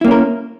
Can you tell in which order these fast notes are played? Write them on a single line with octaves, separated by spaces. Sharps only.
E4 A#3 C#4 A#4